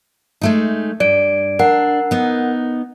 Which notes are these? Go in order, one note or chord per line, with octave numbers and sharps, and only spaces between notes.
G#3 A3 D#4
G2 D5 D7
D4 A#4 F#5
B3 D#4